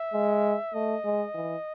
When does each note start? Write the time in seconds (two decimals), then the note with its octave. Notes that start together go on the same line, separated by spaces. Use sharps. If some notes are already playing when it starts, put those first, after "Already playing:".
Already playing: E5
0.13 G#3
0.74 A3 D#5
1.04 G#3
1.35 E3